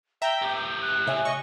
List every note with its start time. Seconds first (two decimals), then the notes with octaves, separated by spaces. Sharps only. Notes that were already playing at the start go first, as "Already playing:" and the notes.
0.22 E5 G5 A#5
0.42 A2 G4
0.57 G6
0.81 F#6
1.06 C#3 E5 G#5
1.25 D#5 C#6